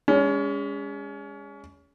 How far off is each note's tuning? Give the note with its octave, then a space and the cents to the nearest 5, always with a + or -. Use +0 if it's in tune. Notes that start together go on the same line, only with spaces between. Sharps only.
G#3 -30 C#4 +30